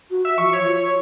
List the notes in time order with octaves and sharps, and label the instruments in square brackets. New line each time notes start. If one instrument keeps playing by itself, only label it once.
[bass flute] F#4
[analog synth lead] E5
[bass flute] F3 [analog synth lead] C#6
[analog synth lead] C#5
[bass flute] F4